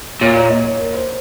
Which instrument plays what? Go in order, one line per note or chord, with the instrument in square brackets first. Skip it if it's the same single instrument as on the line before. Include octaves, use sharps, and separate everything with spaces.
[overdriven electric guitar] A#2 [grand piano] C#5
[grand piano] C#5
D#5
C#5
A#4
C5